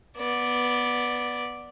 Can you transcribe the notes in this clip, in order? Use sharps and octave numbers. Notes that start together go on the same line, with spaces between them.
B3 D5